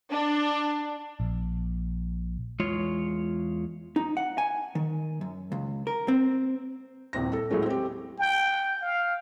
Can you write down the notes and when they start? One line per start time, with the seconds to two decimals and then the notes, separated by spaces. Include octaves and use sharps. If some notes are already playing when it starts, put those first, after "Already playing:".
0.10 D4
1.20 A#1
2.60 E2 G#3 F4 C#5
3.96 D#4
4.17 F#5
4.38 G#5
4.75 D#3
5.21 F#2
5.52 C#2
5.87 A#4
6.08 C4
7.13 D#1 C2 C4 A#6
7.33 A4
7.51 A2 F#3 G#3 A3 C#4
7.66 C4 G4
8.19 G5
8.82 F5